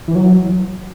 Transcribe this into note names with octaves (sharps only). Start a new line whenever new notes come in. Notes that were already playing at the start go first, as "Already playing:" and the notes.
E3
F#3